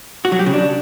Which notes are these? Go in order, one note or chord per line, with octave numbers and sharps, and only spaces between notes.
F#4
F#3
G4
C#3
D4